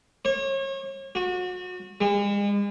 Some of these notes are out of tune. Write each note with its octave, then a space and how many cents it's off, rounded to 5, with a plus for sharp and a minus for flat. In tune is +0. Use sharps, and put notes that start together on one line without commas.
C#5 -35
F#4 -30
G#3 -40